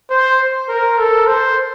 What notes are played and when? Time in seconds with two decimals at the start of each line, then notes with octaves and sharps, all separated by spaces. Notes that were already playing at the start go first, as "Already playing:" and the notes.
0.10 C5
0.68 A#4
0.98 A4
1.27 C5